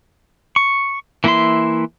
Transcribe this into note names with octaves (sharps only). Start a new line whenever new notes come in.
C#6
E3 A#3 E4 E5 C6